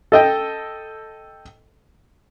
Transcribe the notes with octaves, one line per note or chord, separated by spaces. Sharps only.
A4 D#5 G5